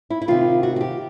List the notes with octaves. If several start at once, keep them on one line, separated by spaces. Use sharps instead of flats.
E4
E4
C3 D#3 F4
F#4
F#4
G4